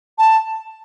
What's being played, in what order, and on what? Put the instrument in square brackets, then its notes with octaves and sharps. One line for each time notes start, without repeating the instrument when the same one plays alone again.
[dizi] A5